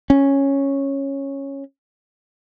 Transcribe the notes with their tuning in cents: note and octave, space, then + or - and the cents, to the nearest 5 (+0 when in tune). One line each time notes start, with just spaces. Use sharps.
C#4 -10